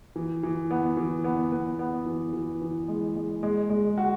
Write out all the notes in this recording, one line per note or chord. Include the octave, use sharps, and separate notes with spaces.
E3
E3
B3
E3
B3
B3
B3
E3
E3
E3
G#3
G#3
G#3
G#3
F#4